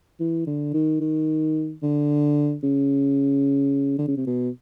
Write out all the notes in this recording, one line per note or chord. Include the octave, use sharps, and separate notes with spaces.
E3
D3
D#3
D#3
D3
C#3
D3
C#3
C3
B2